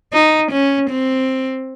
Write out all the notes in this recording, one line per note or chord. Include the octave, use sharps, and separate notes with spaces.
D#4
C#4
C4